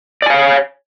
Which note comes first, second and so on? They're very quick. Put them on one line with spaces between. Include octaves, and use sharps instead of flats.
D5 G#5 F5 C#5